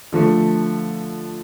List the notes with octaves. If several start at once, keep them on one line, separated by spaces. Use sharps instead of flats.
D3 F3 A3